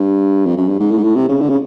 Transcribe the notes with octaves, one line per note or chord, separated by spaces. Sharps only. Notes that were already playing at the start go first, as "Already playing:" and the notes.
Already playing: G2
F2
F#2
G2
G#2
A2
G#2
A2
C3
C#3
D3
C#3